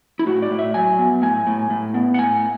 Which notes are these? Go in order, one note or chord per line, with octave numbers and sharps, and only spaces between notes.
E4
A2 F#4
D5
A2
E5
F#3 G#5
B3
A2 G#5
A2
A2
B3
F#5
A2 G#5